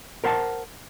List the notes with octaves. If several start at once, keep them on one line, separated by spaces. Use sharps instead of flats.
A#4 C5 F#5 G5 A5